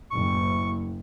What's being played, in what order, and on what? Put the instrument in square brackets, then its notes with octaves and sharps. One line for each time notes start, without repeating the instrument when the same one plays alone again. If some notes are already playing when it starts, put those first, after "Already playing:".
[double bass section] F#1 A2 [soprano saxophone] C#6